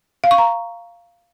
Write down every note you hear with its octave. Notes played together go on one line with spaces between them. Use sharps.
F5
C#6
A#5